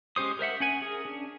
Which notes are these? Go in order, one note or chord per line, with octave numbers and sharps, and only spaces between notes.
G#3 C#4 G4 C5 D#6
A#4 C5 E5 F#5
C#4 F#5 G#5
G#4 A#4
C#4 D4